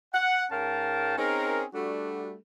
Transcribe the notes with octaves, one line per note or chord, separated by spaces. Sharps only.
F#5
G#2 C#4 A#4 F5 G5 A5
C4 C#4 D#4 G#4 A#4
G3 A3 D4 F#4